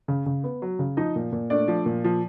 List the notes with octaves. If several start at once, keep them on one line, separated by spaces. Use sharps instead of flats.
C#3
C#3
B3
F#3
C#3
F3 D#4 D#5
A#2
A#2
A3 D4 D5
F3
A#2
F3